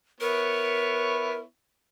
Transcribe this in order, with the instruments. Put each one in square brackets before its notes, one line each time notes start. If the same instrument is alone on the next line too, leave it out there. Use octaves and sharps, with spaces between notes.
[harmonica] B3 E4 C#5 [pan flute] A#4